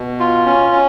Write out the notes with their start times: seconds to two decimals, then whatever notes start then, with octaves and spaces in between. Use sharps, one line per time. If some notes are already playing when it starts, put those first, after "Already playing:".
Already playing: B2
0.20 F4
0.46 C#4
0.72 C#4